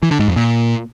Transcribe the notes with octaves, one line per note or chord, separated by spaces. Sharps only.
E3
D3
G#2
F2
A#2